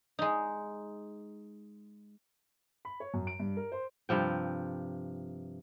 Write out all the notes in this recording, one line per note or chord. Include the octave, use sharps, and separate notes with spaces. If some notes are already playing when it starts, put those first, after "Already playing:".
G#3 D#4
B5
C#5
F#2
D7
G2
A#4
C5
G2 C3 F3 G5